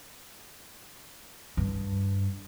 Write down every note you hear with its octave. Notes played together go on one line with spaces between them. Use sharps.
G2